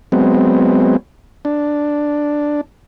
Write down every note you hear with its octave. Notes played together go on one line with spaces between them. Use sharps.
F#3 G#3 B3 C4
D4